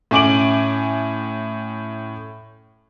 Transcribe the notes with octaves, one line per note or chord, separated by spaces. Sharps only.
A2 C#4 G#5 D6 D7 F#7